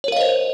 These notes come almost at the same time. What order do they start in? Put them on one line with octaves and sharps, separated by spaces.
C#5 A#4 F5 D#5 C5